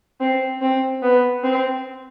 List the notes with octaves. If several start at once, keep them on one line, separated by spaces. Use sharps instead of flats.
C4
C4
B3
C4